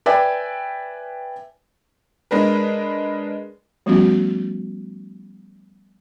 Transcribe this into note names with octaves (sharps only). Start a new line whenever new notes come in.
B4 D5 E5 G5 G#5
G#3 D4 A#4 B4
F3 G3 A3 B3 C#4 F#4